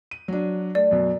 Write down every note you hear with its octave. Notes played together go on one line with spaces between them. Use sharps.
D#7
F#3 D4
A3 D5
F#2 B2